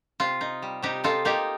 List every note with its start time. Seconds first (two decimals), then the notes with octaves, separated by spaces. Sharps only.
0.20 C3 F4
0.41 D#4
0.62 G3
0.82 C3 D#4 G4
1.04 D#4 F4 A4
1.25 A#3 D#4 G4